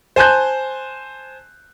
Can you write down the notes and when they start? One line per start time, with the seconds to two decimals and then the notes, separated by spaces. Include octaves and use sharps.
0.16 C5 G#5 A5 F#6 G6